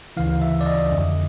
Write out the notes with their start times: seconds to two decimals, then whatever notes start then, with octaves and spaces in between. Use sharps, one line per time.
0.17 D2 C#3 E3 F5
0.42 E5
0.61 D5
0.66 D#5
0.91 F2 D3